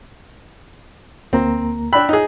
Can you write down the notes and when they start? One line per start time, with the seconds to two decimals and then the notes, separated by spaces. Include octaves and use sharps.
1.33 D2 A#3 C4 A#5
1.93 D4 G5 B5 E6 F#6
2.09 D#4 G#4